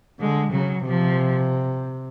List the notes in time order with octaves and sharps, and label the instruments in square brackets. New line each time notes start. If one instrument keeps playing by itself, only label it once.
[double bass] D3 [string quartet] G#3
[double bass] C#3 [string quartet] F#3
[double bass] C3 [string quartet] F3